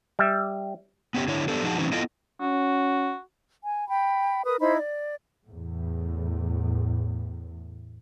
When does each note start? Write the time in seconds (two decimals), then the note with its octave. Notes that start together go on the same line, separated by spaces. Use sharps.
0.19 G3 E5
1.14 B3 C#4 G4 C#5
1.28 D3 E4 C#5
1.48 B3 D4 G4 A4 C5
1.64 F3 D#4 F#4 G#4 A5
1.78 E3 F#3 C4 C#4 D#4
1.92 B3 E4 F4 A4 D#5 G5
2.40 C#4 F#4
3.63 G#5
3.88 G5 B5
4.46 A#4 B4 D#6
4.60 D#4 E4 C5 B5
4.78 D5
5.47 E2 A2